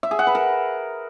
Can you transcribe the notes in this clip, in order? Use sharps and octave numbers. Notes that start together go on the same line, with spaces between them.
E5
G#4
F#5
B4
A#4